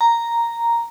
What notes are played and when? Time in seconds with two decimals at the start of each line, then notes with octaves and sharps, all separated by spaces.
0.01 A#5